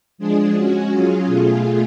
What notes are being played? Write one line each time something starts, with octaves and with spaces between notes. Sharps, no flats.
F3 G#3 D4 G#4
G#3 C#4 F#4
F#3 C#4 F4 G#4
B2 A3 F4 G#4